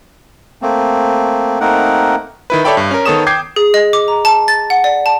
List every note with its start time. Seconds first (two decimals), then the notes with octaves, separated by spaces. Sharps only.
0.62 A3 A#3 C4
1.60 A3 A#3 C4 D#4 A#4 F#5
2.50 D#3 E4 B4
2.65 A4 C#5 D5 E5 G5 B5
2.77 G2
2.91 C#4 A#4
3.05 D#3 B3 A4 C#5 D#6 E7
3.26 G5 D6 G6 G#6 C7
3.56 G#4
3.74 D#5
3.93 D6
4.08 A#5
4.25 A5
4.48 A6
4.70 F#5
4.84 D5
5.06 A5